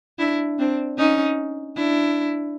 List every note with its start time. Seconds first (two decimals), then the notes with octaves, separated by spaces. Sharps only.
0.19 D4 E4
0.59 C4 D4
0.98 C#4 D#4
1.76 D4 E4